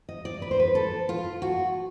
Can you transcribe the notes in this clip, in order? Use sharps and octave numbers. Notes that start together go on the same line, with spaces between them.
D#5
D5
B4
C5
B4
A4
F4
F#4